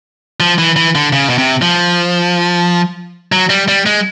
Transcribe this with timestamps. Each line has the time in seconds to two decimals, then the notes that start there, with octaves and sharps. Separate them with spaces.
0.40 F3
0.58 E3
0.76 E3
0.95 D3
1.13 C#3
1.29 B2
1.38 C3
1.62 F3
3.32 F#3
3.50 G3
3.68 G3
3.86 G#3